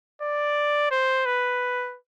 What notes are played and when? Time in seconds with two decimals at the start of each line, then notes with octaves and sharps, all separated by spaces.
0.22 D5
0.91 C5
1.26 B4